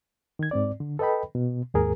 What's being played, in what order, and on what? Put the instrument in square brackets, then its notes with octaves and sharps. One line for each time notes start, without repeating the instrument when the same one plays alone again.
[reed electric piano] D#3 G#6
G#2 C4 D5
D3
A4 B4 D#5 G5 B5
B2
D#2 G#2 G#4 A#4